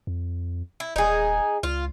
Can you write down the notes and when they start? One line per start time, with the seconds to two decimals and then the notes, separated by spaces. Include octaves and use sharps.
0.07 F2
0.80 E4
0.96 D#1 D#4 G#4
1.63 C#2 F4